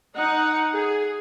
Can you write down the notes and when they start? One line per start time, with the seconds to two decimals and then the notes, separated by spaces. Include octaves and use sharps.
0.14 D#4 F#5
0.72 G#4